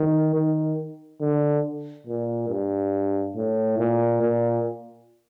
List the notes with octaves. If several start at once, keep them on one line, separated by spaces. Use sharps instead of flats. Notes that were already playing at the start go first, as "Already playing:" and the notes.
Already playing: D#3
D#3
D3
A#2
G2
A2
A#2
A#2